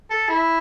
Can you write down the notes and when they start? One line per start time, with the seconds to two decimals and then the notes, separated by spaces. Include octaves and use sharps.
0.11 A4
0.29 E4